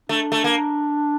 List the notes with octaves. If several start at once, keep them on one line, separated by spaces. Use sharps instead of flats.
A3 D4
A3
A#3